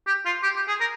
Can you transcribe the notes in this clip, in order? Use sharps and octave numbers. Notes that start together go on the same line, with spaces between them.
G4
F4
G4
G4
G#4
A#4